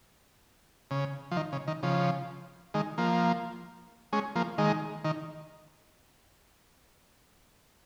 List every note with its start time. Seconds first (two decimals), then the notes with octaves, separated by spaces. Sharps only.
0.91 C#3
1.31 F3
1.37 D#3
1.52 C#3
1.68 D#3
1.83 C#3 F3
2.74 D#3 G#3
2.98 F3 A#3
4.13 G#3 C#4
4.36 F3 A#3
4.58 D#3 G#3
5.05 D#3